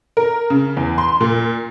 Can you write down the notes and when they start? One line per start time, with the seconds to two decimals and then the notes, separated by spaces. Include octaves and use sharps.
0.17 A#4
0.50 C#3
0.77 E2
0.98 C6
1.21 A#2